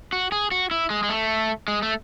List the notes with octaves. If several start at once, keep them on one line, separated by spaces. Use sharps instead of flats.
F#4
G#4
F#4
E4
G#3
G#3
A3
G#3
A3